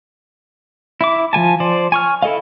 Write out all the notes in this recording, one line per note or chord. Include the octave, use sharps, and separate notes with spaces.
E4 E5 D6
F3 G3 G#5 A5
F3 C5 D5
G#5 C#6 F6
E4 A4 D#5 F5